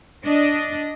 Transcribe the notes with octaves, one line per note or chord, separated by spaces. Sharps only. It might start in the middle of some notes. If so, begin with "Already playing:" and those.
D4 D#5